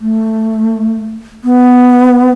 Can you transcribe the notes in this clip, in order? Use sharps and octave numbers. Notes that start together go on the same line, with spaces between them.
A3
B3